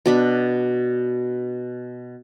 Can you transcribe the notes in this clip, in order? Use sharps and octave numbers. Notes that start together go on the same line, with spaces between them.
B2 D4 B5